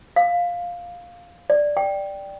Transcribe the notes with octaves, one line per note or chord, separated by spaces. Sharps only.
F5
D5
G5